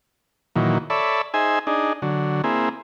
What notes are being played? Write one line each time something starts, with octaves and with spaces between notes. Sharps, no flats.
A#2 D#3 E3 F#3
A4 C#5 D5 E5 B5
D#4 G#4 C5 E5 G#5
D4 D#4 G#4
D3 F#3
A#3 C4 E4 G#4